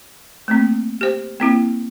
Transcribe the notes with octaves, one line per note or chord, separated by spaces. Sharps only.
A3 A#3 C4
G4 C5
A#3 C4 E4